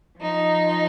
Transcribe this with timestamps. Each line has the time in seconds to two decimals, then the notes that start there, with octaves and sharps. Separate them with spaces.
0.19 F3 D#4